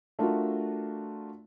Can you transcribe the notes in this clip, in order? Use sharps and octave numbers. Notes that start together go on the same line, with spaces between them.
A3 D4 F4 F#4 A#4